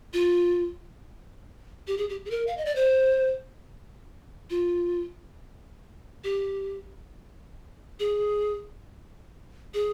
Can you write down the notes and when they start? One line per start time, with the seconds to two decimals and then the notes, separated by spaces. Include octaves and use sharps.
0.13 F4
1.87 G4
1.98 G#4
2.09 G4
2.25 G#4
2.31 A#4
2.47 F5
2.57 D#5
2.65 D5
2.76 C5
4.50 F4
6.24 G4
8.00 G#4
9.74 G#4